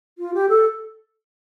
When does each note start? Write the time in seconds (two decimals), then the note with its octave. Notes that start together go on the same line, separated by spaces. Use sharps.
0.18 F4
0.34 G4
0.49 A4